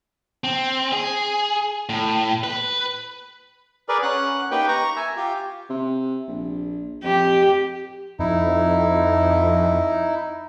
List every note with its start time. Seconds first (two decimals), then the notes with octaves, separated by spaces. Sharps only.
0.44 C4
0.93 G#4
1.89 A2
2.44 B4
3.89 G#4 A#4 B4 D5
4.03 C#4 F#5 F#6
4.51 A#3 D#4 G4 B4 G5
4.68 A#5 C#6
4.97 E5 G#5
5.17 F4 G4
5.70 C3
6.28 A#1
7.04 F2 G4
8.19 F2 D#4 E4